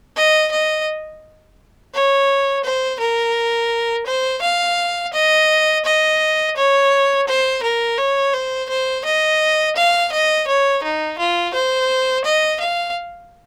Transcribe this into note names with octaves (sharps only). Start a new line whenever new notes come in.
D#5
D#5
C#5
C5
A#4
C5
F5
D#5
D#5
C#5
C5
A#4
C#5
C5
C5
D#5
F5
D#5
C#5
D#4
F4
C5
D#5
F5